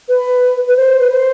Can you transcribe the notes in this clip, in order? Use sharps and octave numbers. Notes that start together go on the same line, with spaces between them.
B4
B4
C5
B4
C5